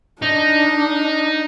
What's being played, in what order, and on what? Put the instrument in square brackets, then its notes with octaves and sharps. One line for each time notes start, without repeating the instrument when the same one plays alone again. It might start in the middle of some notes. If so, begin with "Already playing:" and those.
[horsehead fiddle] D4 [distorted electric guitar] D#4